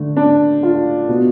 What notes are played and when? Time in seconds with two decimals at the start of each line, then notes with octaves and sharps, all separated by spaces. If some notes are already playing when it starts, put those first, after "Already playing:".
Already playing: D3 A3
0.17 D4
0.63 F4
1.09 B2